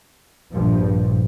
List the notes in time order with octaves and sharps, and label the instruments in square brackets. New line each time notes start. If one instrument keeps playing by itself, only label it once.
[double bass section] A#1 G2 F3